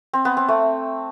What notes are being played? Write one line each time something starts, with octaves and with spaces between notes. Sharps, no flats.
C4
B3
C4
A3